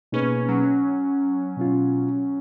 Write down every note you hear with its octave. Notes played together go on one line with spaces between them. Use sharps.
B2 A#3 C#4 D#4 G#4 B4
F#3
B2 F#3 C#4 F4